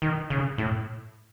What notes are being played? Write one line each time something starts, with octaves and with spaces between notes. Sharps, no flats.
D#3
C#3
A2